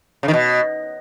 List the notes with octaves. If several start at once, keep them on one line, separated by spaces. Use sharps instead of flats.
C#3
D#3
B2